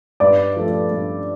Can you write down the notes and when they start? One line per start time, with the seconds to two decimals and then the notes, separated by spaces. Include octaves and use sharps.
0.20 G2 B4 D5
0.56 F3 A3
0.91 G2